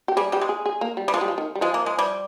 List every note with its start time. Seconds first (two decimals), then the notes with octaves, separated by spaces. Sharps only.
0.08 G4
0.17 G3 G#4
0.32 G3 G4
0.41 G#3
0.49 G#4
0.66 G#4
0.81 A#3
0.97 G3
1.08 G3
1.14 F3 G#3
1.21 G3
1.28 F3
1.38 D#3
1.55 G3
1.61 F3 G#3
1.74 A#3
1.86 G#3
1.99 G3